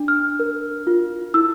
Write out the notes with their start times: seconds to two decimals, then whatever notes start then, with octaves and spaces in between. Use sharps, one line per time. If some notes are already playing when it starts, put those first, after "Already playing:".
Already playing: D4
0.08 F6
0.40 A#4
0.87 F4
1.34 E4 E6